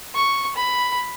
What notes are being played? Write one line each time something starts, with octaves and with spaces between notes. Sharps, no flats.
C#6
B5